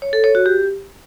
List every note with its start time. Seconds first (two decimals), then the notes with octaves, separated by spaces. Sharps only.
0.02 C#5
0.13 A4
0.24 C#5
0.35 F#4
0.46 G4